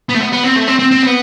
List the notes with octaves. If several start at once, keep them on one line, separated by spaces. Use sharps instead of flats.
B3
A3
B3
B3
C4
A3
C4
C4
C4
B3